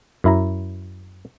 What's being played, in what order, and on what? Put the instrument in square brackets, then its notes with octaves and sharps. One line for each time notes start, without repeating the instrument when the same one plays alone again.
[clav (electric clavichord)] F#2 E4 A#5